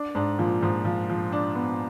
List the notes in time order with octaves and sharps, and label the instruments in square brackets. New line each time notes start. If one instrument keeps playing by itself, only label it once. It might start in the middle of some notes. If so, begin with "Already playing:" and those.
Already playing: [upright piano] D4
[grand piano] G#2 [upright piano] D4
[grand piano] A#2 [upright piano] F3
[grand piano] G#2 [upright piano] F3
[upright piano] F3
F3
D4
B3